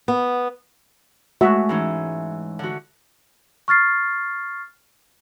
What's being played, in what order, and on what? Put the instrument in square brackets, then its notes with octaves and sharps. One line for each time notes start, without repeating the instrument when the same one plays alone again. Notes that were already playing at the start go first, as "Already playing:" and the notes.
[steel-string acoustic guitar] B3
[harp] G#3 A3 [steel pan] F#4 E5
[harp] G#2 E3 C#4
D3 F#4
[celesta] C#6 F6 A6 C7